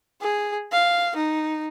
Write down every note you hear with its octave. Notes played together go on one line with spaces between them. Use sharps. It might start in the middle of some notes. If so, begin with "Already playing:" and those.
G#4
F5
D#4